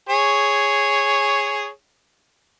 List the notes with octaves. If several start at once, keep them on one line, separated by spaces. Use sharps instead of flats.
G#4 C#5